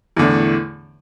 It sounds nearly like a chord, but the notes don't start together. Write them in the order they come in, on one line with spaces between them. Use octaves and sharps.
E2 D3 A2